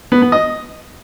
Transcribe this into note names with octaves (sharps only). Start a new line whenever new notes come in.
B3
B3
D#5